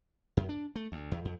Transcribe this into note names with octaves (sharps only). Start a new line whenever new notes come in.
F#2
D4
A3
D2
E2
F2